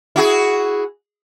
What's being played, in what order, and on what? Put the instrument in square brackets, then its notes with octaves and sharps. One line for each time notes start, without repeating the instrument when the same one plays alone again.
[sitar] E4 F#4 G#4